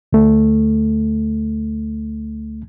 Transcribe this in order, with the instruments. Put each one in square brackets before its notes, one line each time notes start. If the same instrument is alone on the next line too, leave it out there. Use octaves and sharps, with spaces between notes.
[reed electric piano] D2 A3